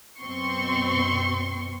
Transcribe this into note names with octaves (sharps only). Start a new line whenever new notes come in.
F#2 B2 C4 C6 C#6